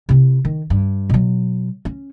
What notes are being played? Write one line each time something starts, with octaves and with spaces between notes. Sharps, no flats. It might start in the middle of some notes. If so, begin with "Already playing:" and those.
C3 E4
D#3
G2
B2 F#3
C#4